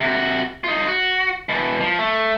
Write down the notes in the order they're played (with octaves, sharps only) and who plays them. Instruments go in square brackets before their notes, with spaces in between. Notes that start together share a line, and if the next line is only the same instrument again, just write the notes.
[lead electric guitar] C3 F#4
D#4 F4
F#4
B2 E3
F3
A3